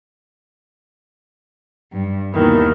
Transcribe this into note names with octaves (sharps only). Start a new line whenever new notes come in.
G2
D#2 B2 D#3 E3